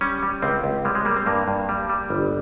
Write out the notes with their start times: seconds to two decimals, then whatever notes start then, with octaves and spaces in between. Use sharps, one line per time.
0.01 G3 C#4
0.23 G3
0.42 C#2 C4
0.64 C#2
0.85 G3 G#3
0.95 G#3
1.05 G3 A#3
1.17 C4
1.26 G2 A#3
1.48 G2
1.69 G3
1.90 G3
2.10 G1